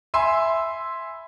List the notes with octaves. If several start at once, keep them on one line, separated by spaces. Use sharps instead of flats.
E5 G#5 B5 C6 E6